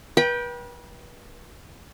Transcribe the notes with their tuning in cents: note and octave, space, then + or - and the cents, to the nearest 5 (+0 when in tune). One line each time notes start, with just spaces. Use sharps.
B4 -35 G5 +0